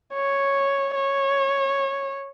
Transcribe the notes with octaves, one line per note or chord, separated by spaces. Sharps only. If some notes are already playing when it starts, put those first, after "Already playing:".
C#5
C#5